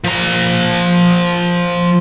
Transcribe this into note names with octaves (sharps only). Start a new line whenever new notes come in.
F3 A#5